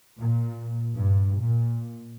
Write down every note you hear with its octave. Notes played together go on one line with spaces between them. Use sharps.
A#2
G2
A#2